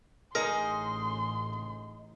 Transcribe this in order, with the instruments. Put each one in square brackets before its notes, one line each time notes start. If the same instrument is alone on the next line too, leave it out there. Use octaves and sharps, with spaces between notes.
[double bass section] A1 [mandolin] D#4 G#4 [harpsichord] A#4 [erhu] C6